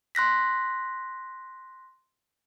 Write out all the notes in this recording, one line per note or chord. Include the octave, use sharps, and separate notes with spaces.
C6 F#6 A#6 B6